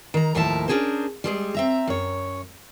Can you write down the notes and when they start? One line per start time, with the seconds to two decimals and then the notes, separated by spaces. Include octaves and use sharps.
0.14 D#3 A#5
0.35 D#2 A2 F3 A#4 E5 A5
0.68 C#4 D4 F#4 G#4 A#4 C5
1.24 G3 G#3 G#4
1.55 C4 E5 A#5
1.87 F#2 C#5